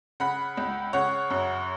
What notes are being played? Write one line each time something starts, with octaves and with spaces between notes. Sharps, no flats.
C#3 F#5 B5
C#2
C#3 C#5 F#5
F#2